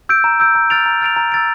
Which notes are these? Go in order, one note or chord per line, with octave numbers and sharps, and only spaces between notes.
E6 G6 D7
A#5
E6 G6 D7
A#5
F6 A6 D7 F7
A#5
F6 A6 D7 F7
A#5
E6 A6 D7